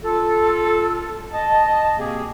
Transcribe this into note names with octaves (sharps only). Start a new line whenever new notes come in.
F4 A4
D#5 A5
B2 A#3 C4 G4 G#4